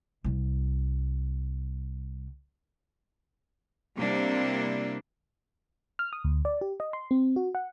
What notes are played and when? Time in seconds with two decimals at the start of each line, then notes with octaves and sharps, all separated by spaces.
0.24 C2 G3
3.97 C3 G3 A#3 C4 D4 E4
5.99 F6
6.13 D#6
6.24 D2
6.45 D5
6.61 G4
6.80 D#5
6.93 C6
7.11 C4
7.36 F#4
7.55 F#5